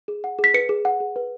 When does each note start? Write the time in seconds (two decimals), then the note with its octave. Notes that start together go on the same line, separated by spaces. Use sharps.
0.08 G#4
0.24 F#5
0.39 G#4
0.44 B6
0.54 B4 C#7
0.69 G#4
0.85 F#5
1.00 G#4
1.16 B4